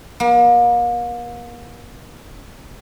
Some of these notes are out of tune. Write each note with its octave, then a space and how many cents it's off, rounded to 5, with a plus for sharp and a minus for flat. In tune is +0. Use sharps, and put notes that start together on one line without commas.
A#3 +40